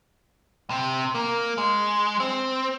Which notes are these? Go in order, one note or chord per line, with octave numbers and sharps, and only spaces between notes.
C3
A#3
G#3
C4